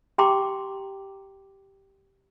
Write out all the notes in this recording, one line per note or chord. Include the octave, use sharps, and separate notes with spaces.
G4 G5 A#5 C6 D6